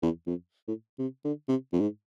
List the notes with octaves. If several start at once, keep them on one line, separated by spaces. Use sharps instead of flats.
E2
F2
A2
C3
D3
C3
F2
G#2